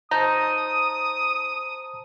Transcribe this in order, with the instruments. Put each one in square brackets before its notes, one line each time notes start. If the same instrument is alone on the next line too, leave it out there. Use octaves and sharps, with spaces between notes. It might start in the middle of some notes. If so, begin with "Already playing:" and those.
[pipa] D#4 [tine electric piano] C5 A5 A#5 [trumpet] D#6